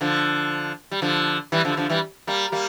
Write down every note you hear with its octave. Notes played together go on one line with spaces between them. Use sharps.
D3 F3
G3
D3 F3
E3 G3
D3 F3
D3 F3
E3 G3
G3 A#3
G3 A#3